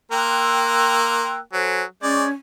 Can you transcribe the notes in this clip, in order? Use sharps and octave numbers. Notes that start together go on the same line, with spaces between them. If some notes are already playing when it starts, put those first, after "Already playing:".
A#3 A#4 G5 C6 E6 F#6
F#3 A4 C5 G#5
G#3 C#4 D5 C#6 G6 G#6